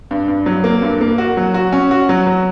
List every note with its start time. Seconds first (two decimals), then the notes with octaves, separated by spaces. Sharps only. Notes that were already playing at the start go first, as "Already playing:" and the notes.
0.11 G2
0.28 G2
0.46 F#3
0.64 A#3
0.82 G2
1.01 A#3
1.18 F#4
1.37 F#3
1.54 F#4
1.72 C#4
1.91 F#4
2.09 F#3
2.26 F#3